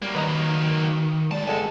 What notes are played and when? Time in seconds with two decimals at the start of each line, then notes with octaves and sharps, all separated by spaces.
0.02 F#3 G3 A#3
0.15 D#3 B4 D#5 A#5
1.31 D#2 G#3 D5 A5
1.47 G1 G#3 A4 G#5